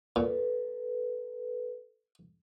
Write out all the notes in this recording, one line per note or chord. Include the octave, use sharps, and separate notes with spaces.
A#2 A4 B4